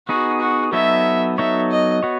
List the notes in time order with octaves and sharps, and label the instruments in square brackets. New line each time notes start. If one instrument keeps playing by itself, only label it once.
[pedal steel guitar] B3 D#4 G#4 [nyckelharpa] F#4
[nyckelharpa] F#4
[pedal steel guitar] F#3 B3 D#4 A4 C#5 [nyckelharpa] E5
[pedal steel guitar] F#3 B3 D#4 A4 C#5 [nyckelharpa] E5
[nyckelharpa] D#5
[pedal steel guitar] B3 F#4 C#5